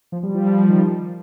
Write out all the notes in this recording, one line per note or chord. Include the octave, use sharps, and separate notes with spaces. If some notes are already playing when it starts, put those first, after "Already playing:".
F3
G3
F3
G3
F3
D#3